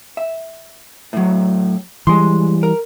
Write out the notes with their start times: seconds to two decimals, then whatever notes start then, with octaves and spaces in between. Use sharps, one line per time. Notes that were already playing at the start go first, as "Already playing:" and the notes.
0.17 E5
1.13 A2 F#3
2.07 E3 G3 G#3 C6
2.63 A#4